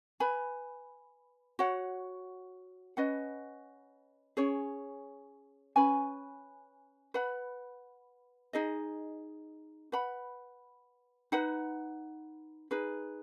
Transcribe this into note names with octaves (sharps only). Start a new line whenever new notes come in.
B4 G#5 B5
F#4 C#5 F#5
C#4 B4 D#5 F#5
C#4 G#4 C#5
C#4 B4 G#5 B5
B4 F#5 B5
D#4 G#4 D#5
B4 F#5 B5
D#4 B4 F#5
D#4 G#4 B4